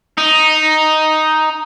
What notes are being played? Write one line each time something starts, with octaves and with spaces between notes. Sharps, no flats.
D#4